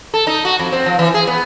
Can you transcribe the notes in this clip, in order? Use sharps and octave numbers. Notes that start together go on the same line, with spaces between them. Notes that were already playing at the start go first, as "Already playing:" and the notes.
A4
D#4
F#4
F2
C4
F3
E3
G#4
B3